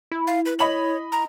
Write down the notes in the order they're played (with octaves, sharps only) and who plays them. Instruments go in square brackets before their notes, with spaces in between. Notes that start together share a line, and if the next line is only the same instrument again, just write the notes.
[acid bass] E4
[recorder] F5
B4
[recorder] C#5 [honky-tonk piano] D#5 B5 F#7
[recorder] A#5